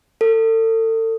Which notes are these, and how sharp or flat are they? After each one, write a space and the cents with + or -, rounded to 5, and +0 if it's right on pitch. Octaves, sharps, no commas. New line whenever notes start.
A4 +35